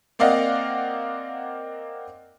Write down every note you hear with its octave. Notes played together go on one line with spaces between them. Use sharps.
A#3 C4 D5 D#5 F5 F#5